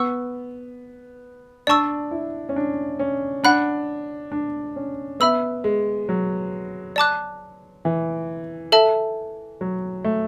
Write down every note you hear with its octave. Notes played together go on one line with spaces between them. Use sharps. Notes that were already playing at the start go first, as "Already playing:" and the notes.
Already playing: B3 F#5 C#6 E6
D4 D5 A5 C#6 E6
E4
C#4
D4
C#4
D4 F#5 B5 F#6
D4
C#4
B3 E5 B5 E6
G#3
F#3
D5 A5 D6 F#6
E3
A4 E5 A5
F#3
A3